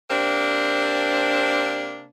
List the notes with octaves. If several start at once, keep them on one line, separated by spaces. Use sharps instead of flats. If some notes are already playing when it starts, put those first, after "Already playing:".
C3 A#3 C4 D4